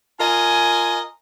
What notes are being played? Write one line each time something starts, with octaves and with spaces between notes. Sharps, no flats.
F4 A#4 D#5 G#5